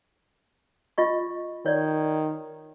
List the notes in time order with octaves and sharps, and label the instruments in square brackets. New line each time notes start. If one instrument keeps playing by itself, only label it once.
[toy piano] F4 D#5 C#6
[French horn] D#3 [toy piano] C#5 D5